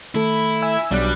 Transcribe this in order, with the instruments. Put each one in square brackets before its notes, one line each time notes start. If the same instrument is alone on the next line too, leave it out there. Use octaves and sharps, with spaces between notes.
[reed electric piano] D#3 A3 A4 [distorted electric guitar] E4
[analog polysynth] E5 G#5 E6
[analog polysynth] B1 D4 F#6 [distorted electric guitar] G3